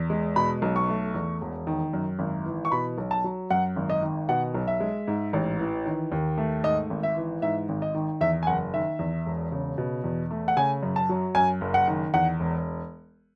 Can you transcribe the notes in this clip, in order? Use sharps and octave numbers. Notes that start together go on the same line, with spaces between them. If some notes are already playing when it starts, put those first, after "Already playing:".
Already playing: E2
G#3
B2 B5
B1
C#6
A3
E2
E1
D#3
F#2
G#1
E3
C#6
B2 B5
B1
A5
F#3
F#2 F#5
G#1
D#5
D#3
B2 F#5
B1
E5
G#3
G#2
A1
E3
D#3
D#2
A3
G#2 D#5
G#1
E5
E3
G#2 E5
G#1
D#5
D#3
E2 E5
G#5
F#1 F#5
D#3 E5
E2
E1
C#3
B2
E2
A3
F#5
C#3 G#5
F#2
A5
F#3
F#2 G#5
F#1
F#5
D#3
E2 F#5
E1